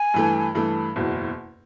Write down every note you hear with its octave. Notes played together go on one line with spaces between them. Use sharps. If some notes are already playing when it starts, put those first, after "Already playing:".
Already playing: G#5
G2 E3 A3
G2 E3 A3
F#1 E2 B2